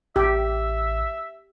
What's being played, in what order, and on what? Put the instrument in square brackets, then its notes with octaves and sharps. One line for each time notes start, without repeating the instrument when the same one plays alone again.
[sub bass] A1 [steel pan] G4 [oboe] E5